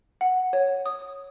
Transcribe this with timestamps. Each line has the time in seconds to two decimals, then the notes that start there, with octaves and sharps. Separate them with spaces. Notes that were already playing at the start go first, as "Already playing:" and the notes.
0.21 F#5
0.53 C#5
0.86 D#6